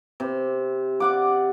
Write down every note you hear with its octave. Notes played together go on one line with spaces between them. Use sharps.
C3
D5 F#5 D6